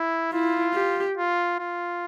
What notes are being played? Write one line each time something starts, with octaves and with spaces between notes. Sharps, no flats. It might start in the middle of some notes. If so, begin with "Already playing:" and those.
Already playing: E4
E4 F4
G4
F4
F4